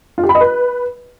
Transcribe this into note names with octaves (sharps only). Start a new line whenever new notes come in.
F4
G4
B5
D#5
B4